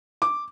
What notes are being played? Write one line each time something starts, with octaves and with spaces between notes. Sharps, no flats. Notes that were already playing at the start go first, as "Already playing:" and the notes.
D6